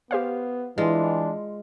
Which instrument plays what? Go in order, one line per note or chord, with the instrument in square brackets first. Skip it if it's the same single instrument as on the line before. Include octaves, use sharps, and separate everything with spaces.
[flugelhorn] B3 [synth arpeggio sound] G4 C5 F5
[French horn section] E3 [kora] G#3 F4 [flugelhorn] D4